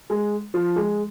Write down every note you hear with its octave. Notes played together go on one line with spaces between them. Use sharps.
G#3
F3
G#3